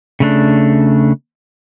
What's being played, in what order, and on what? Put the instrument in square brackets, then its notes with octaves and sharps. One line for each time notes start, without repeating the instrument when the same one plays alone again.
[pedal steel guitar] C#3 A3 D4